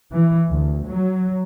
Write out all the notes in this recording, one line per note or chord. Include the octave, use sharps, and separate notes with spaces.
E3
D2
F#3